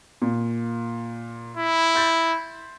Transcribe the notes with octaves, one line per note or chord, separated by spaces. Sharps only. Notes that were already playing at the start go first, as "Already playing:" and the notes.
A#2
E4
C6 G6 A6